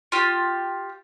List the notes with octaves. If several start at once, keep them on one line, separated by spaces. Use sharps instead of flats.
F4 G4